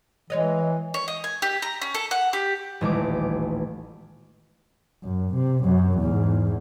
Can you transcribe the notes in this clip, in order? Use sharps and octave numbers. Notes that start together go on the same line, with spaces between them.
E3 G#3 C#5 D#5
C#5
D#5
G#5
G4
A#5
C#4
A4
F#5
G4
D#1 A1 G#3 D6
F#2
C3
F#2 F#3
E2 G#2